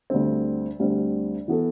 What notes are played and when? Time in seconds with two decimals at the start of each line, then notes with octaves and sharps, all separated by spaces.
0.10 D2 D3 G3 C4
0.79 D2 D3 G3 C4
1.48 E3 B3 F#4 A4